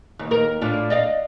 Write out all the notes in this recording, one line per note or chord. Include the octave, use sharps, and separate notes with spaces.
D#2
D#2 A#4
A2 D4 F4
D5 D#5 F5